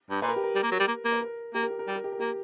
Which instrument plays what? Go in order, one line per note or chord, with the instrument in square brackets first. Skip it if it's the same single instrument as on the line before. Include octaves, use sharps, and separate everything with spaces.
[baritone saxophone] G2
[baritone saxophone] A#2 [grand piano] B4
[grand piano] A#4
G4
A#4
[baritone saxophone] G3
A#3
F#3
G3
A#3
A#3
[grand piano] B4
A#4
[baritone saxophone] A#3 [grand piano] G4
[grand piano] A#4
G4
A#4
[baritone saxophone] G3 [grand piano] G4
[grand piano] A#4
G4
A#4
[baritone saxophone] A#3 [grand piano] G4